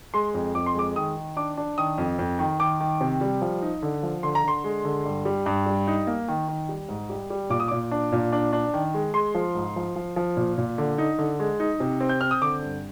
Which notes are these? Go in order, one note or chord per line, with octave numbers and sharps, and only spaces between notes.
G#3 C6
F2
F2 D6
C6
G#3 D6
D#3 D#6
D#3
D4 D6
D4
D#3 D#6
F2
F2
D#3
D#3 D6
D#3
C3
G3
F3
D#4
D3
F3
D3 C6
A#5
D3 C6
G#3
D3
G2
G3
G2
G3
D#4
A#3
D#3
D#3
G3
G#2
G3
G3
A#2 D6
D#6
A#2 D6
D4
A#2
D4
D4
D#3
G#3
G#3 C6
F3
G#2
F3
F3
F3
A#2
A#2
D3
D#4
D3
G#3
D#4
C3
C4
G6
C4 F6
D#6
D3 D6
G2